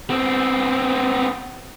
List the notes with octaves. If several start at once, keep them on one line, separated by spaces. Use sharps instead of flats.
B3 C4